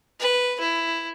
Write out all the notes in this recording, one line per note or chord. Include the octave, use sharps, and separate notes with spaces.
B4
E4